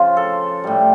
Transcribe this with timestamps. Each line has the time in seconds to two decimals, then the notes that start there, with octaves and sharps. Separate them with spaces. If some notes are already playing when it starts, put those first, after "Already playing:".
Already playing: C#3 F3 F4
0.17 A4
0.64 A2 G3